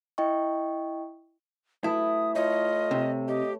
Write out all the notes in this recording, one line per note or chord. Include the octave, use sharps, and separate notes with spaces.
E4 D#5 G5 C#6
A3 E4 A4 B4 D#6
F4 C#5 D#5
C3
G4 D#5